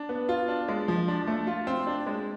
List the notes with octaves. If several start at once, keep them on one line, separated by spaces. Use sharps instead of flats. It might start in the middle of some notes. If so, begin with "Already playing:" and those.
Already playing: D4
B3
F4
D4
G#3
F3
D4
A3
F4
C4
D4
G#3